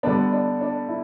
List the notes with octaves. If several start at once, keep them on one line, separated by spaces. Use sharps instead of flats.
D3 G3 B3 D4
D4
D4
E4